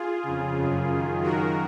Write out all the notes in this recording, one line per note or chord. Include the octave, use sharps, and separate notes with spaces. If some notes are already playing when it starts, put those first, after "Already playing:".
Already playing: F4 G#4
F2 C#3
F#2 C#3
F#2 D#3
F#2 D#3 F#4 A#4